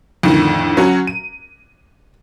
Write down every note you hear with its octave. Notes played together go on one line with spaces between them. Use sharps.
F2 A2 D3 D#3
F#3 C#4 F#4
D#7